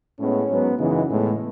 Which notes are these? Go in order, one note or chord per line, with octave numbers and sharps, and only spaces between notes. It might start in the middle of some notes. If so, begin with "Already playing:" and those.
A2 G#3 B3 C#4
G#2 F#3 B3
F#2 C#3 E3 G#3 B3 D#4
A2 G#3 B3